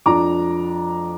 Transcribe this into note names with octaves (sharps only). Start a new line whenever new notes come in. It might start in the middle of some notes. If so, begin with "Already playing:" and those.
F2 F3 D4 A#5 D6